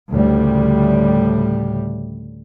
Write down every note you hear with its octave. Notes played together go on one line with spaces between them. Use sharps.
D2 A2 C#3 G3